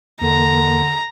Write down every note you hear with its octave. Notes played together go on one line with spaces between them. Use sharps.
E2 D3 A#3 A#5